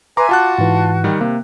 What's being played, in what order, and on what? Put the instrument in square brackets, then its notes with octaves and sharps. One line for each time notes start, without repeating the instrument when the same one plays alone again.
[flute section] B4 E5 G#5 [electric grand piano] A#5 C6 [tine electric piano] D6
[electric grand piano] F4 A5 F#6 [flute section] F#4
[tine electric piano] G#2 E3
[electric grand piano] D#3 G3
[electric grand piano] C3 [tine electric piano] A#3